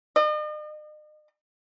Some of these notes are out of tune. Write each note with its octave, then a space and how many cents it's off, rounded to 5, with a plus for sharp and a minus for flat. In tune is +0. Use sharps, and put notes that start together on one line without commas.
D#5 -45